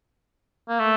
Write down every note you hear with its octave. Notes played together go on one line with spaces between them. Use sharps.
A#3
A3